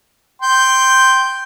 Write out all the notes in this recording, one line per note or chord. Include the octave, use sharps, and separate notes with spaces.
G5 C6